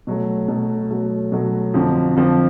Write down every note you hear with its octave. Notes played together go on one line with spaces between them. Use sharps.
B2 F#3 A3
B2 F#3 A3
B2 F#3 A3
B2 F#3 A3
F2 D3 F3
F2 D3 F3